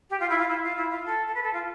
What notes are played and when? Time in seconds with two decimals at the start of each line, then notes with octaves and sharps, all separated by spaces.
0.10 G4
0.20 F4
0.29 E4
0.38 F4
0.49 E4
0.63 F4
0.76 E4
0.90 F4
1.06 A4
1.27 A4
1.34 B4
1.43 A4
1.53 F4